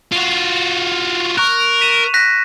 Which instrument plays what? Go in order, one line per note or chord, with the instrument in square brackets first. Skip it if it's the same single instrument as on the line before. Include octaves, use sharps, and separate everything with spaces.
[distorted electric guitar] F4 F#4
[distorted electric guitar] A#4 [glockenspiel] C#6 F#6
[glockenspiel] B6 D#7 E7
F#6 A#6 B6